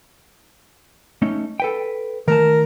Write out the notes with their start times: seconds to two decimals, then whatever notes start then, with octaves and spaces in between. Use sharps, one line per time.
1.22 A3 C#4 D#4
1.60 A4 B4 G5
2.28 D#3 A3 A#4 A5